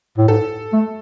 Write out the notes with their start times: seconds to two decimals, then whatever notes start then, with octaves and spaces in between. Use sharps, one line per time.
0.18 A2
0.28 G#2 A4
0.73 A3